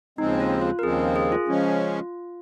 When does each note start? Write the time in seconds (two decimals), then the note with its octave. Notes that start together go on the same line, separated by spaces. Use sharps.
0.18 D#2 C#3 F3 G#3 C4 D#4
0.40 F4
0.62 F4
0.79 A#4
0.83 D#2 C#3 F3 G#3 C4 G#4
0.99 A#4
1.16 G#4
1.32 F4
1.48 C#3 F3 G#3 C#4